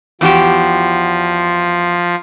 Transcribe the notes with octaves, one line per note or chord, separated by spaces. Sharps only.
E2 F3 F#4 G4